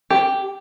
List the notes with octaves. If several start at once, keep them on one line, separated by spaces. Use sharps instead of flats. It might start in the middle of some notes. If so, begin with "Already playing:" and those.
G4